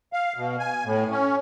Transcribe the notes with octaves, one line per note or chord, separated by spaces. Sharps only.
F5
B2
G#5
A2
C#4